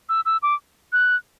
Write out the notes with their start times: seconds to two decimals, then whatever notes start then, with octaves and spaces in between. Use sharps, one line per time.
0.09 E6
0.26 E6
0.43 D6
0.93 F#6